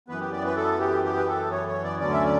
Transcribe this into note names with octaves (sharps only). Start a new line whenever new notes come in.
F#2 E3 B3 B4
G4
D5
B4
A4
G4
G4
B4
A4
C#5
C#5
D5
D2 D3 F#3 C#4 D5
E5
D5